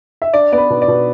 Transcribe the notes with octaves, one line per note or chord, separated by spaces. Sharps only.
E5
D4 D5
B3 D5
B4
B2
D5
B2